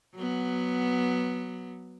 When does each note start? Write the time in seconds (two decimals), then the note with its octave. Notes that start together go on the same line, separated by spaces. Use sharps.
0.16 F#3 B3